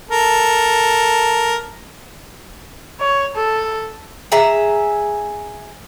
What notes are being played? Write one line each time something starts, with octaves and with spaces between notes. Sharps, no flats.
A4 A#4
C#5
A4
G#4 E5 A#5